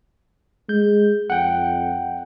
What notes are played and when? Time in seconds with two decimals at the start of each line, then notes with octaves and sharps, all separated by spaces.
0.69 G#3 G6
1.30 F2 F#5 G5